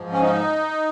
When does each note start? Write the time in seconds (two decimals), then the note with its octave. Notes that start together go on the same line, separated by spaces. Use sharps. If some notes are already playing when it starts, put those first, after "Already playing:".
Already playing: G#2 F3
0.12 C#4
0.22 D#4